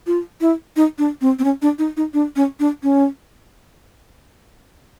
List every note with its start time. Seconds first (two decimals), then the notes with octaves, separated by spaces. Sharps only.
0.07 F4
0.41 E4
0.76 D#4
0.98 D4
1.21 C4
1.39 C4
1.44 C#4
1.62 D4
1.79 D#4
1.97 D#4
2.14 D4
2.36 C#4
2.60 D4
2.83 C#4